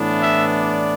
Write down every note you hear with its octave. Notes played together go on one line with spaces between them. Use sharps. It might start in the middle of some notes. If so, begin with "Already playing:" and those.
Already playing: A2 E3 B3 D4
E5
D5